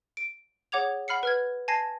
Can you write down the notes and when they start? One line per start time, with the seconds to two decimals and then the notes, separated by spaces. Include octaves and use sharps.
0.17 D7
0.72 G#4 C#5 F#5 D6 G#6 F7
1.08 F#5 B5 F6 C7 C#7
1.23 B4 F6 G#6
1.68 G#5 A5 G#6 A#6 C7